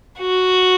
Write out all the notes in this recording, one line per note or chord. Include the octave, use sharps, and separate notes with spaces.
F#4